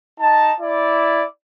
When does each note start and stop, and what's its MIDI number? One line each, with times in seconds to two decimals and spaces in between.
0.20 0.52 63
0.20 0.52 81
0.60 1.24 64
0.60 1.24 74